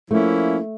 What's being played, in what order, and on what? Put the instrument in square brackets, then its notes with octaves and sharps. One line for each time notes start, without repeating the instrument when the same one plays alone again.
[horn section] F3 A#3 C#4 E4 [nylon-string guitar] A3